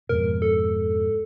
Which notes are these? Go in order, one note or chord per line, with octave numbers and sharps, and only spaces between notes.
F2 G#2 B2 A#4
A4